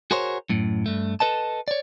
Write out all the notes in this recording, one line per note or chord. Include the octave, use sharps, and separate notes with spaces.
F#4 G#4 A#4 C5 C#5
F#2 A2
G2 A3
A4 B4 D#5 A5
C#5 D5